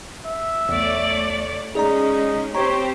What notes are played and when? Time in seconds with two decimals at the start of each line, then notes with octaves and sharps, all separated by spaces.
0.26 E5
0.69 B1 E2 A3 C#5 D5
1.75 G#3 C#4 D#4 G#4 D5 A#5
2.55 C4 G4 C5 C#5 A#5